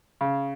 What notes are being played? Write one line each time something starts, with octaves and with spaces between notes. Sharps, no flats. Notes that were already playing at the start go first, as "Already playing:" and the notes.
C#3